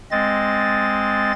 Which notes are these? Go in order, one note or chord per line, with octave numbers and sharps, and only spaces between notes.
G#3 C4 D#5 A6